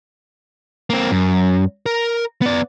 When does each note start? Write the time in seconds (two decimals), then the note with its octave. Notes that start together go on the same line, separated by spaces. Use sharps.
0.90 A#3 C4
1.12 F#2
1.86 A#4
2.42 B3 D5